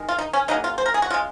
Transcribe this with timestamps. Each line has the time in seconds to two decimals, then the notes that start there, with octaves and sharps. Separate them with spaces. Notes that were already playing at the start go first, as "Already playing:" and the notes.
Already playing: D#3 G#3
0.09 F4
0.18 D#4
0.33 C#4
0.48 C#3 F#3 A#3 D#4
0.64 F4
0.78 C5
0.86 A#4
0.94 G#4
1.02 F#4
1.10 C#3 G#3 F4